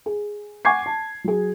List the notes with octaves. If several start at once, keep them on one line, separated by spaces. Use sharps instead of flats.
G#4
F#5 G#5 C#6 D6 G#6 C7
A5
F#3 G#4